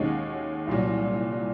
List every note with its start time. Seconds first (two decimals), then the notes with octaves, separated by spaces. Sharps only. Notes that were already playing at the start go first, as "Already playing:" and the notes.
Already playing: D#2 D#3 G#3 C#4 F#4
0.67 C2 A#2 F#3